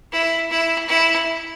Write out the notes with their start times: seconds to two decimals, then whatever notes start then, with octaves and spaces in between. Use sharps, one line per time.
0.12 E4
0.50 E4
0.88 E4